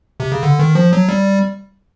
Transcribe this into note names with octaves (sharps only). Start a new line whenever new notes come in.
C3
C#3
D3
D#3
F3
F#3
G3